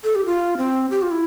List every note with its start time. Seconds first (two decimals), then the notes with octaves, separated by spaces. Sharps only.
0.04 A4
0.15 G4
0.26 F4
0.58 C4
0.91 G4
1.02 F4
1.11 E4